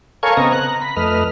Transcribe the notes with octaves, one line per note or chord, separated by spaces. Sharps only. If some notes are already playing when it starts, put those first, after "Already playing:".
A4 A#4 C#5 F5 G#5 C#6
C#3 B3 C4 D#5 A#5
F#6
A#5
B5
F2 A3 B4 D#5 F6